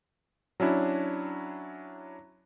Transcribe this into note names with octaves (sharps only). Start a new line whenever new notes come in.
F#3 C#4 D4 E4